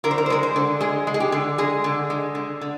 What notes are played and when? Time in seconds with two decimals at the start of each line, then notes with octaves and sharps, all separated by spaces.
0.04 D3 A#4
0.11 C5
0.18 A#4
0.26 C5
0.30 G#3 A#4
0.43 C5
0.56 D3
0.81 G#3 G#4
1.07 G#3
1.14 G#4
1.20 G4
1.32 D3
1.58 G#3 G#4
1.84 D3
2.10 G#3
2.35 D3
2.61 D3